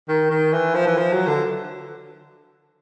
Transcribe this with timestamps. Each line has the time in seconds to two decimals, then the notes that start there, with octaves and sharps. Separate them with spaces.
0.08 D#3
0.30 D#3
0.52 E3
0.75 F3
0.87 E3
0.97 F3
1.12 F#3
1.27 D3